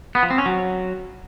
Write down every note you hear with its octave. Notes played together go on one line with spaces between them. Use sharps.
B3
F3
C4
C#4
F#3